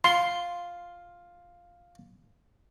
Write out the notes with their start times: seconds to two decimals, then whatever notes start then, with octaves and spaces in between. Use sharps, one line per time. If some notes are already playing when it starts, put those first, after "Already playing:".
0.04 F4 C6